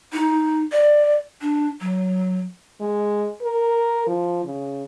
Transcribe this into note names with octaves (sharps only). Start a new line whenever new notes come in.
D#4
D5
D4
F#3
G#3
A#4
F3
C#3